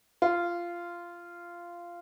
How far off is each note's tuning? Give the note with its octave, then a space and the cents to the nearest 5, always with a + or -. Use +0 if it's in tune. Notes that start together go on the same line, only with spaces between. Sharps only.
F4 -15